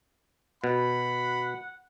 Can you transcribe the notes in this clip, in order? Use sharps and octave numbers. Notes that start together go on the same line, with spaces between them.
B2 F#5 B5